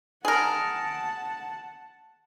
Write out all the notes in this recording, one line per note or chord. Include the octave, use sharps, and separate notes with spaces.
G#4 A#4 F#5 A5